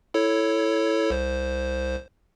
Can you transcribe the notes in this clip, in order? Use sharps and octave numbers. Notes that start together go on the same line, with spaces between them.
E4 A4 C#5
C2 C5